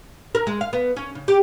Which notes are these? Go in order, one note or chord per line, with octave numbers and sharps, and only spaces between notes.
A#4
G#3
F5
B3
C#4
C#3
G4